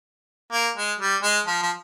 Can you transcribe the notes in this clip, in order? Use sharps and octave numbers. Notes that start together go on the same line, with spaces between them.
A#3
G#3
G3
G#3
F3
F3